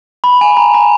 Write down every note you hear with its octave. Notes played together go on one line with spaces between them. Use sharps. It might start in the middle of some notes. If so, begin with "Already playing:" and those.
B5
G#5
A#5
A#5